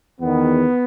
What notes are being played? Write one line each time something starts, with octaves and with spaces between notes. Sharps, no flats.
E2 D#3 B3